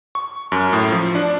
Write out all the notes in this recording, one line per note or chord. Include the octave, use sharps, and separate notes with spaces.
C#6
F#2
A2
F3
D4